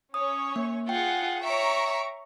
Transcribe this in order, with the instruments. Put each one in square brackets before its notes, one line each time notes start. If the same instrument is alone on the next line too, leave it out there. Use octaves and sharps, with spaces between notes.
[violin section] C#4 C#5 [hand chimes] D#6
[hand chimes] A#3
[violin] F4 [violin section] G#4 F#5 [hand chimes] G5
[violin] C#5 E5 [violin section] A#5 C#6 D7